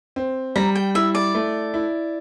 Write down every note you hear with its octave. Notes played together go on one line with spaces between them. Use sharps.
C4
G3 A#5
G5
E4 E5
D5
A3
E4